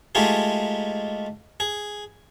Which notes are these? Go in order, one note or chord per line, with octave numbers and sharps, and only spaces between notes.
G#3 A3 D#4 F4 G4 G#4
G#4